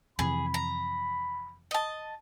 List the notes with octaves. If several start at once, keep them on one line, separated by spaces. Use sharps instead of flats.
F2 C3 E3 G#4 B5
A#5
D#5 A5